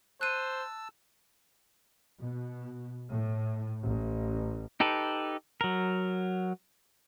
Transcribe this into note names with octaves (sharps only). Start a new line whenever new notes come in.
C5 A5 E6 F#6 D#7
B2
A2
A1
D#4 G4 A4 B4
F#3 A#4